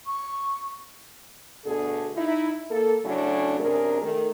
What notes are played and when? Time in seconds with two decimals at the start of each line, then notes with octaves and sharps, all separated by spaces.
0.06 C#6
1.64 D2 B2 D3 G#4 A4
2.17 D#4 E4
2.69 A#3 A4
3.04 C#3 F#3 A3 C#4 D4 E4
3.58 F#2 C3 D4 G#4 A#4
4.01 D#3 A3